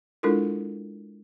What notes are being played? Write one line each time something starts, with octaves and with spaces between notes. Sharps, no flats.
G#3 D4 E4 F4 A4 A#4